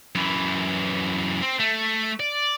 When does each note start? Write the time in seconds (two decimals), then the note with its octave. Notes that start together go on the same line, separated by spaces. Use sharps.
0.15 F#2 E3
1.42 C4
1.60 A3
2.20 D5